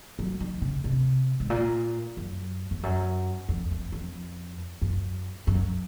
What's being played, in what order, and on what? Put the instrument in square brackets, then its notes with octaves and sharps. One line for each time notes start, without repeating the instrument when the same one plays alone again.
[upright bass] F#3
D#3
C#3
C3
G#2
A#2
F#2
F2
F#2
F2
F2
F2
F#2
F#2